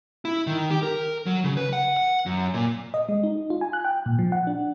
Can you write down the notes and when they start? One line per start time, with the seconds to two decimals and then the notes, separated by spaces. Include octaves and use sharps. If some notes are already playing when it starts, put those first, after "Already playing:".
0.25 E4
0.47 D#3
0.71 G4
0.83 A#4
1.26 F#3
1.44 C#3
1.57 B4
1.73 F#5
1.97 F#5
2.26 F#2
2.54 A#2
2.94 D#5
3.09 G#3
3.23 D#4
3.50 F4
3.61 G#5
3.73 F#6
3.85 G5
4.06 A#2
4.19 F3
4.32 F#5
4.47 D4